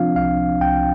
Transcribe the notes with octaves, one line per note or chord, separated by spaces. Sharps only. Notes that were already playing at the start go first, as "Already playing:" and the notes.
Already playing: C3 F3 C4 D4 F4 F5
C2 F5
C2 G5